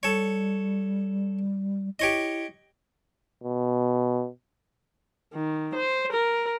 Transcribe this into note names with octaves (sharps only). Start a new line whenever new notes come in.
G3 A4 C#5
E4 G4 C#5 D#5
B2
D#3
C5
A#4